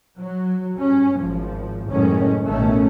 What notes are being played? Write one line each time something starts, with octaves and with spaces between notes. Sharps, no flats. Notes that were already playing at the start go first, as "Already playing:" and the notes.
F#3
G2 C#4
G#1 F3
F#1 F#2 A2 D#3 G#3 C#4
A1 B2 D#3 A3 C#4